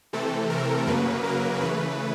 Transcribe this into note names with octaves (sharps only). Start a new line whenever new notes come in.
C3 E3 A3 C4 A4
A#4
F#2 C#3 F#3 A#3 B4
A#4
C#3 E3 A3 B4